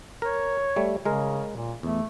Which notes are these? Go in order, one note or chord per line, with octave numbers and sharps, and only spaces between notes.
A#4 C#5
G3 A3
C#3 G#3 A#4
A#2
E2 A3